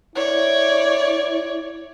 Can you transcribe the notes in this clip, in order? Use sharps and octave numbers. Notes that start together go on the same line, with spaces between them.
E4 C#5 D5